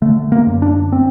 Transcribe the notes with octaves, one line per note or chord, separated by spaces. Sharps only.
D3 A3
A#3
F#2
D4
C4